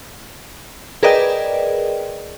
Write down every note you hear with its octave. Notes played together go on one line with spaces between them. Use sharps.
G#4 A#4 B4 D5 D#5 G5